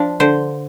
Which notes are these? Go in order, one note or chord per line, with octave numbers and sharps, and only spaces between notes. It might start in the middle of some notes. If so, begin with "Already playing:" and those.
Already playing: F3 D4
D3 C5